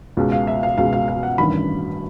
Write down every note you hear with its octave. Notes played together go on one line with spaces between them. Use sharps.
C#2 B2 G#3
F5
E5
F5
C#2 B2 G#3 F5
F5
F5
F#5
A1 G2 D#3 B5